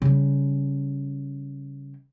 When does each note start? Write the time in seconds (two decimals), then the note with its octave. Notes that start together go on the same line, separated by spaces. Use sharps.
0.02 C#3 G3